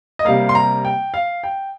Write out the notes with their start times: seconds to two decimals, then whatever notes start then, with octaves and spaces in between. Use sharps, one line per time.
0.19 D#5
0.25 C3 G3 A#3 F5
0.49 C6
0.55 A#5
0.85 G5
1.14 F5
1.43 G5